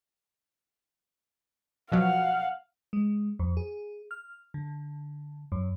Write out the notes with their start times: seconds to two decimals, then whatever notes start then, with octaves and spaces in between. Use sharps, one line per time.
1.92 B2 F3 F#3 F5 F#5
2.93 G#3
3.39 F2
3.57 G#4
4.11 F6
4.54 D3
5.52 F#2